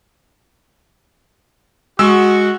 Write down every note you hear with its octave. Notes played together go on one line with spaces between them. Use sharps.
G#3 F#4 E6